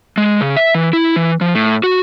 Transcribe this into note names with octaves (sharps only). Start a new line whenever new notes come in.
G#3
C#3
E5
E3
E4
E3
F3
A2
F#4